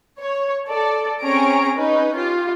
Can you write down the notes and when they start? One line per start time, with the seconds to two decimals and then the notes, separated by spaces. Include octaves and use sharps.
0.19 C#5
0.69 A4 D5
1.21 C4 C#4 G#4 C#5 A#5 D7
1.75 C#4 D#4 B4
2.17 F4 G4